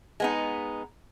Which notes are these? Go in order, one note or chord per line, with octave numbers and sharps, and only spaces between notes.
G#3 B3 D#4